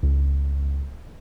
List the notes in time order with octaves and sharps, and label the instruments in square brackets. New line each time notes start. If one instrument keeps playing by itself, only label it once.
[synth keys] C#2